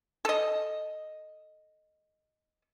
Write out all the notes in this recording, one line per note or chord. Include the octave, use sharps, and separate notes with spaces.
A4 D#5